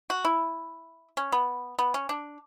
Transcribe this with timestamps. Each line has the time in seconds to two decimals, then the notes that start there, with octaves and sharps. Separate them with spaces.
0.10 F#4
0.25 E4
1.17 C#4
1.32 B3
1.79 B3
1.94 C#4
2.09 D4